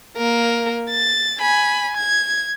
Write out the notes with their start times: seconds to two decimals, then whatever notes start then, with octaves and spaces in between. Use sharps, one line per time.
0.17 A#3 A#4
0.91 A6
1.40 G#5 B5
1.97 G#6